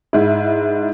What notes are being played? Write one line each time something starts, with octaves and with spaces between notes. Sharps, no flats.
G#2 E4